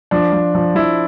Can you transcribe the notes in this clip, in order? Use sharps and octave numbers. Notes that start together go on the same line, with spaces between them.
F3 D4
F3
F3
F3 E4